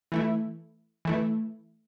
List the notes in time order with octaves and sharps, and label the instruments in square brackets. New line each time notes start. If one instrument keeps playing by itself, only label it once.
[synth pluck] E3 A3 E4
E3 A3 E4